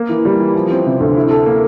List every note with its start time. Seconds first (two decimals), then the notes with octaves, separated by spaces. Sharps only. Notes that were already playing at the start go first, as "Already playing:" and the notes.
Already playing: A#3
0.09 E3
0.25 G3
0.40 E3
0.56 F3
0.71 C4
0.86 C3
1.00 D2
1.16 E4
1.31 A4
1.46 A#3